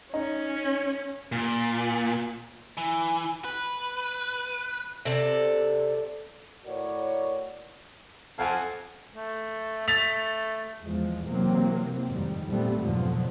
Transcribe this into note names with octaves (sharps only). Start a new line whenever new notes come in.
C#4 D#4
A#2
E3
B4
C3 A4 D5
A2 F#4 A#4 C#5 D5
F2 F5 F#5 G#5
A3
A3 A6 B6 F7
E2 F3 G#3
C3 E3 F#3 A#3 C4
F2 G#2 D#3 G3
A#2 G3 A3 B3 C4
F2 G#2 B2 D3 F3 F#3